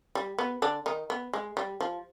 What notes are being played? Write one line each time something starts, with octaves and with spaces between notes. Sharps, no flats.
G3
B3
D3 D4
D#3 D#4
B3
G#3
G3
F3